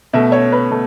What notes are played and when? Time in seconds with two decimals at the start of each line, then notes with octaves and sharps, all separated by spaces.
0.13 B2 A3 E5
0.32 C#5
0.52 B4
0.71 B2 A3